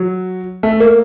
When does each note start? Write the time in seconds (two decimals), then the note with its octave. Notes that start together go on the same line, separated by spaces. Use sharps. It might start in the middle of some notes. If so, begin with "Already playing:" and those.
Already playing: F#3
0.63 A3
0.80 A#3